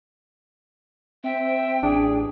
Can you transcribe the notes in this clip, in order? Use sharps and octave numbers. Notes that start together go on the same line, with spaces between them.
C4 E5 G5
A1 D4 G#4